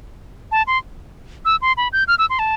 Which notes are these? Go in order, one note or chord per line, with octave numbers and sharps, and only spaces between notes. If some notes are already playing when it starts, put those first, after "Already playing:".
A5
C6
E6
C6
B5
G6
F6
E6
C6
A5